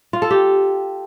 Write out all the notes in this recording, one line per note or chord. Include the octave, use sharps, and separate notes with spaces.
F4
A4
G4